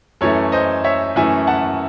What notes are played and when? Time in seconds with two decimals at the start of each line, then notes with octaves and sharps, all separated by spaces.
0.21 F#2 E3 A3 A4 C#5
0.52 C5 D#5
0.84 C#5 E5
1.16 F#2 E3 A3 E5 G#5
1.47 F#5 A5